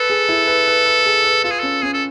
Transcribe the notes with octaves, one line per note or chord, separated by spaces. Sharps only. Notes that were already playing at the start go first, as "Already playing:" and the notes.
Already playing: A4 B4
G#4
E4
B4
B4
B4
G#4
B4
F4 A4
G#4
C#4 A4
C#4 G#4
A4